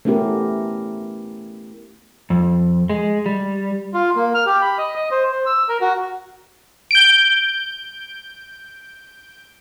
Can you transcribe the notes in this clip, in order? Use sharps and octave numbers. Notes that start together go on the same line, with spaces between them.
A3 B3 C#4 E4 G4 A#4
F2
G#3
G3
F4
A#3
F6
G4
B5
D#5
D#5
C5
C5
E6
A#4
F#4
G6 D7